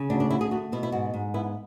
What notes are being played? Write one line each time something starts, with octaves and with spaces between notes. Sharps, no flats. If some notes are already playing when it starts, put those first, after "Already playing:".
Already playing: C#3
D2 D4
D4
D2 E4
G#4
A3 F#4
B2 E4
E4
G#2 F#4
G#2
B3 E4